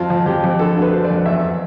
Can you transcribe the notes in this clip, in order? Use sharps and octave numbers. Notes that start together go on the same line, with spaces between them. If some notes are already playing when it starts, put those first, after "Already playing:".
Already playing: F2 F4
F2
F2 G4
F2
D3 A4
D3
B4
D3 C5
D5
F2
E2 E5